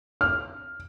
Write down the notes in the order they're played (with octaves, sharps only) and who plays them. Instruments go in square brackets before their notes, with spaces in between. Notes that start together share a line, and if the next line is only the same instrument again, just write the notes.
[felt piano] F6